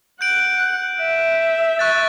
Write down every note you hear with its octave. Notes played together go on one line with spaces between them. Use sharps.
F#5 G6 D7 F#7
E5
C#6 F#6 A6